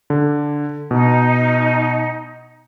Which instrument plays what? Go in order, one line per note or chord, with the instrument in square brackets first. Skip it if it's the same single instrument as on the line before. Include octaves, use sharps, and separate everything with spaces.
[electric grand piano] D3
[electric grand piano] B2 [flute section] D#4